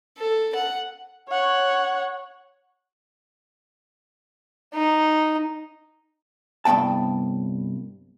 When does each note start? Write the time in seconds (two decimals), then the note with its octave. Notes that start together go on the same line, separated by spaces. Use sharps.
0.18 A4
0.55 F#5
1.29 C#5 F#5
4.74 D#4
6.65 C2 G2 B3 G5 A5